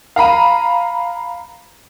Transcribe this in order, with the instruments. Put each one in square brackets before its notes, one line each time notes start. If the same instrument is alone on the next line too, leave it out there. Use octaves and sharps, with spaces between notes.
[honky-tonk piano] F5 A#5 B5 D#7